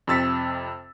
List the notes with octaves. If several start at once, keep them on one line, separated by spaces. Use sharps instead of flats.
F2 C3 E6 A6 B6 C#7